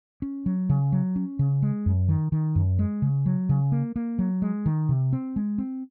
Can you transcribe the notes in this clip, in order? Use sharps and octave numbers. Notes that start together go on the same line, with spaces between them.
C#4
F#3
C#3
F#3
C#4
C#3
G#3
F#2
D#3
D#3
F#2
G#3
C#3
F#3
C#3
A#3
A#3
F#3
G#3
D#3
C3
C4
G#3
C4